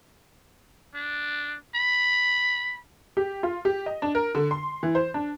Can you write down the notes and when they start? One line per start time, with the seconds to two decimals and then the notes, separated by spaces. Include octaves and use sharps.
0.95 D4
1.75 B5
3.17 G4
3.43 F4
3.65 G4
3.86 D#5
4.02 D4
4.15 A#4
4.35 D3
4.51 C6
4.83 E3
4.95 C5
5.14 D4